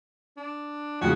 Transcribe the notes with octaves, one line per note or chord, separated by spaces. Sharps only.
D4
F2 G#2 C#3 F#4